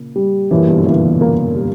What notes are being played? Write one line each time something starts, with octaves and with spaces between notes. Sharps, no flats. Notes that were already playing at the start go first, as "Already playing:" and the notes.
Already playing: A#2 C#3
G3
F#2 A#2 E3
G2 B2
D3
A#2 C#3 E3
E2
F#2 A#3
G3